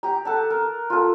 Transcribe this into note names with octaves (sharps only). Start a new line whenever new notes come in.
G4 A#5
A4 F#5 A5
A#4
F4 A4